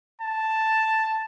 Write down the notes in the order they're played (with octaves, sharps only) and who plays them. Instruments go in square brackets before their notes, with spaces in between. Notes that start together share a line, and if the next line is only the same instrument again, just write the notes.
[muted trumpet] A5